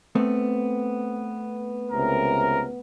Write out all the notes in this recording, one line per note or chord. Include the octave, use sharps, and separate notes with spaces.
A3 B3 C4
C#2 C3 A#4